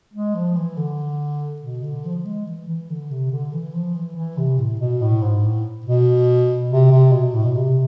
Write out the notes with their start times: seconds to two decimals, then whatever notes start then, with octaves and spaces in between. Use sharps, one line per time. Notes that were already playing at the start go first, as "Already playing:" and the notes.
0.14 G#3
0.35 F3
0.56 E3
0.77 D3
1.62 B2
1.83 D3
2.05 F3
2.17 F3
2.25 G#3
2.47 E3
2.68 E3
2.89 D3
3.11 C3
3.32 D3
3.53 E3
3.74 F3
3.95 E3
4.16 E3
4.38 C3
4.59 A2
4.80 B2
5.02 A2
5.22 G#2
5.43 A2
5.86 B2
6.71 C3
6.91 C3
7.12 B2
7.34 A2
7.45 B2
7.56 C3